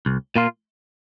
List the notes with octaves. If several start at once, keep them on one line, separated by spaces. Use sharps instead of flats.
C2
A#2 A#3 F4